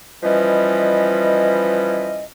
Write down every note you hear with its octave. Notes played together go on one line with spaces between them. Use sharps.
E3 F3 G3 C#4 B4 D#5